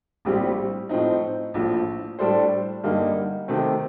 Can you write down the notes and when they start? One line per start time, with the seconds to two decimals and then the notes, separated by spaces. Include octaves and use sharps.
0.25 A#1 A2 G3 C4 G4
0.89 A2 F3 C4 D#4
1.54 A#1 A2 F3
2.19 A2 G3 D4 A4 C5
2.83 G2 D3 G3 A#3 D#4
3.48 C3 D#3 A3 C4